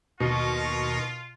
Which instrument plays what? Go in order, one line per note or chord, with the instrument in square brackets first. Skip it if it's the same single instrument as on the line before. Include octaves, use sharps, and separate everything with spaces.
[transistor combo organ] D#2 A#4 C#6 [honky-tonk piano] B2 [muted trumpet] F4